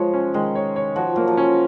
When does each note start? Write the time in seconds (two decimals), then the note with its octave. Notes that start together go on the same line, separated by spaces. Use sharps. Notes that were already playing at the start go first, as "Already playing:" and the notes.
Already playing: F3 G#3 C#5
0.14 C#4
0.34 D#3 G#3
0.55 C#5
0.76 C#5
0.96 F3 F#4
1.16 F#3 A#3
1.28 F3
1.37 C#4